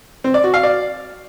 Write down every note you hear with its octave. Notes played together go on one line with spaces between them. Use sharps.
C4
D5
F#4
F5
D5